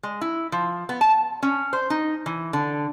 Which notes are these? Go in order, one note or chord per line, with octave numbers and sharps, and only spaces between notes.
G#3
E4
F3
B3
A5
C#4
C5
D#4
E3
D3